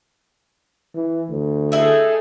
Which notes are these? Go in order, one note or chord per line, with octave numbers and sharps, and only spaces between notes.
E3
D2
D#4 E4 G#4 A4 E5